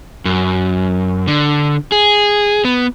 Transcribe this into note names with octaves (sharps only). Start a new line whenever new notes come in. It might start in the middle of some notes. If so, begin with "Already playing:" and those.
F#2
D3
G#4
B3